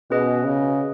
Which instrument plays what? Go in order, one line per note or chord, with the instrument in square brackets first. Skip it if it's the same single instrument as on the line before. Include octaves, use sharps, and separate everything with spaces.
[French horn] B2 [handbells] C#4 G#4 B4 D#5
[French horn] C#3